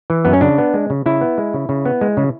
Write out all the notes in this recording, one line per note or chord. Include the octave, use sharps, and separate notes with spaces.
E3
F#2 B3
C#4
C#3 D4
B3
G#3
C#3
C#3 E4
B3
G#3
C#3
C#3
B3
G#3
C#3